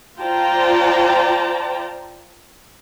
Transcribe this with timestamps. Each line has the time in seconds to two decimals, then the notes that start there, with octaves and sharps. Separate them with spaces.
0.21 F4 C5 D5 G5 A5 A#5